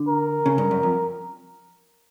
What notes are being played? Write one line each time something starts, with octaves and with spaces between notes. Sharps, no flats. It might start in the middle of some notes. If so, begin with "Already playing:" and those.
Already playing: D3
A#4
C#3
G2
F#2
F2